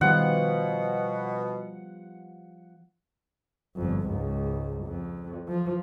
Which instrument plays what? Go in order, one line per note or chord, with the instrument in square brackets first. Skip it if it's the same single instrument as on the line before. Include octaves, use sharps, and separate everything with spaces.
[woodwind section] B2 [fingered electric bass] D#3 [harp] F3 G3 B3 [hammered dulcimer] F#5
[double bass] G1 F2
C#2 G#2
F2
F3